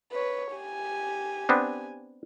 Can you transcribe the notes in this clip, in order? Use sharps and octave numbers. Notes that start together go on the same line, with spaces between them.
B4 C#5
G4 G#5
B3 C4 D4